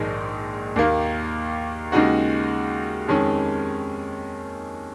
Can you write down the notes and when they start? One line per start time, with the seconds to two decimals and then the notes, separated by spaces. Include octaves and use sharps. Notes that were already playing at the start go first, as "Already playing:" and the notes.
Already playing: A#1 G#2 D#3 G#3 D#4
0.76 D#2 D#3 A#3
1.92 D#2 C#3 G#3 D#4 F#4
3.08 F2 D#3 G#3 C#4